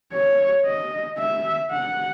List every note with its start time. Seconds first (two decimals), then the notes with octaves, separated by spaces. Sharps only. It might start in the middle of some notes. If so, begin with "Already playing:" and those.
0.13 C#5
0.66 D#5
1.18 E5
1.71 F#5